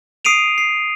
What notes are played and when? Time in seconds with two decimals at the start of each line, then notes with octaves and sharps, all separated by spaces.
0.25 D#6 C7 D7 D#7 F7
0.58 C7